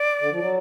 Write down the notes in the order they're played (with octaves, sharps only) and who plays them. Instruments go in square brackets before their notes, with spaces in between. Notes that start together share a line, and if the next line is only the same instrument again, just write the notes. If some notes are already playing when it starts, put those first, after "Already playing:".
Already playing: [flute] D5
[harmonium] D3
F3
F#3